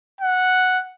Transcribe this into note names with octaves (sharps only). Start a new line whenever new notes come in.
F#5